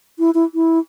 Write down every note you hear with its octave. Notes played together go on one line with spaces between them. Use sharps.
E4
E4
E4